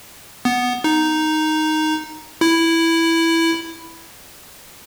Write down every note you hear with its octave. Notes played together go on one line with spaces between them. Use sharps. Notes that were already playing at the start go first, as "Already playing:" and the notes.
B3
D#4
E4